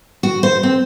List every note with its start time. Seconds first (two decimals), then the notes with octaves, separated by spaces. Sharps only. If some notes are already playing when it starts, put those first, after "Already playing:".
0.23 F#4
0.43 C5
0.63 C4